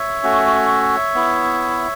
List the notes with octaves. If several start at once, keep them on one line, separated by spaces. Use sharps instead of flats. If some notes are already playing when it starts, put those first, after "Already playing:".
Already playing: C#5 E5
A3 C#4 F#4
B3 E4